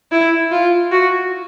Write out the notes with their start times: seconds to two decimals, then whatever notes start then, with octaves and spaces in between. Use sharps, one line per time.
0.11 E4
0.51 F4
0.91 F#4